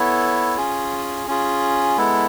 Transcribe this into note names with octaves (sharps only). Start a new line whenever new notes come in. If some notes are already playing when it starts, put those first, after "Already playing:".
Already playing: B3 E4 A4 C#5
C#4 F4 G#4
C#4 F4 G#4
G#3 B3 E4 A4